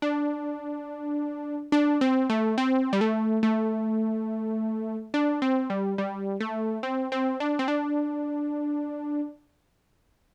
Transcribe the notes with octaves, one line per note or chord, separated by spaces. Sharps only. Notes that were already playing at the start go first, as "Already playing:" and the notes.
D4
D4
C4
A3
C4
G3
A3
A3
D4
C4
G3
G3
A3
C4
C4
D4
C4
D4